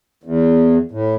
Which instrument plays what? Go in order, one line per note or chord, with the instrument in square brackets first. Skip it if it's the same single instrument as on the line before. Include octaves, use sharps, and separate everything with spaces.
[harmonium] E2
A2